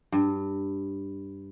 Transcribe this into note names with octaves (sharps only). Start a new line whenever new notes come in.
G2